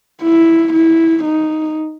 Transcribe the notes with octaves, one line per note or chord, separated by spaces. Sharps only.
E4
E4
D#4